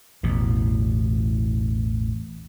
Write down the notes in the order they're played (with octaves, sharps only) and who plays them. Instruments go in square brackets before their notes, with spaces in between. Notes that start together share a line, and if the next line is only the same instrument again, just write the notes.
[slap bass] A1 E2 B2